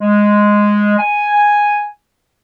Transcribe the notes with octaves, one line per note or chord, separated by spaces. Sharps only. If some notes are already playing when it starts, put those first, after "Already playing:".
G#3
G#5